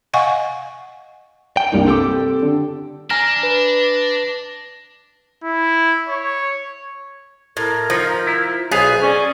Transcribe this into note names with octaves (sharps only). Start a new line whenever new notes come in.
D#5 F5 F#5 G#5 C#6
G5
C2 G2 G3 A#3 D#4
C4 G4 A4 G5 D6
D3
D4 G#5 A#5 F6 A#6
B4
E4
C#5
A2 A#4
F3 D#4 F4
E4
B1 B3 G#4 C5 F5
C#4 D5 G#5